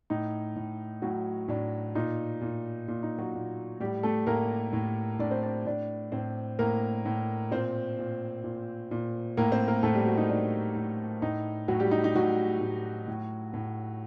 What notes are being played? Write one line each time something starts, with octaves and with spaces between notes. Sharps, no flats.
A2 D#4
A2
A2 F#3 F#4
A2 D4
A#2 D#4
A#2
A#2
D#4
F#3 F#4
A#2
A2 G3 G4
A3 A4
A2 A#3 A#4
A2
A2 D4 D5
C4 C5
D4 D5
A2 D4 D5
A2 C4 C5
A2 A#3 A#4
A2
A#2 C4 C5
A#2
A#2
A#2
A2 A#3 A#4
C4 C5
A#3 A#4
A2 A3 A4
G3 G4
F#3 F#4
D#4
A2 D4
A2
A2 D#4
A2 F#3 F#4
G3 G4
D#4
D#4
A2 F#3 F#4
A2
A2
A2